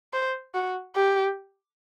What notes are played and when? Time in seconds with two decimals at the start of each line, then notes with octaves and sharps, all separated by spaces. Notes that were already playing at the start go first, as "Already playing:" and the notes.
0.13 C5
0.54 F#4
0.96 G4